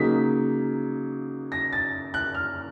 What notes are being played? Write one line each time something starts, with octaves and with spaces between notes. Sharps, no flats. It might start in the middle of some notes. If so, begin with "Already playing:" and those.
Already playing: C#3 F#3 A#3 D#4 B6
A#6
A6
F#6
F6